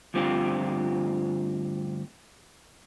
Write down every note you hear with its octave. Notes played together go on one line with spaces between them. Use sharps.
D2 G2 F3 C4 F4 G4